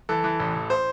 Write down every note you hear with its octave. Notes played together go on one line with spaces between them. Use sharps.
E3 A4
E3
A1
A1
C5